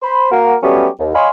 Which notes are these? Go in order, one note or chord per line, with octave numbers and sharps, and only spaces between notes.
C5 B5 C6
A#3 F#4 A#4
F#3 G3 A3 B3 C#4 G4
D#2
C#5 D#5 F5 G#5 B5 C6